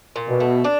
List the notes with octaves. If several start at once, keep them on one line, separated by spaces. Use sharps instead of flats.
A#2
B2
A3
D4